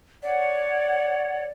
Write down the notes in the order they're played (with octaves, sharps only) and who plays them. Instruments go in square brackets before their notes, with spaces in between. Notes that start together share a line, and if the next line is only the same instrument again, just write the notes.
[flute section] C#5 F#5 [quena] D5